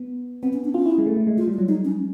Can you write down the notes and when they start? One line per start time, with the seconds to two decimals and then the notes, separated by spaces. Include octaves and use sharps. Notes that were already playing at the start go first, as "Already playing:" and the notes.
Already playing: B3
0.43 B3 C4
0.53 C#4
0.65 D4
0.74 C#4 F4
0.86 E4
0.98 G#3
1.06 A3
1.17 A3
1.27 G#3
1.37 G#3 F4
1.48 G3
1.53 F4
1.58 F#3
1.68 G#3 D#4
1.84 C#4